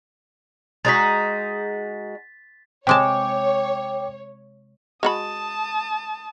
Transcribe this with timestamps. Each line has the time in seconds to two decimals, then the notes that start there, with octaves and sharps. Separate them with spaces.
0.85 G#3 D#4 F#4 A6 B6
2.87 C3 G#3 C#5 G5 A5 D6
5.03 G#3 F#4 A5 B5 D#6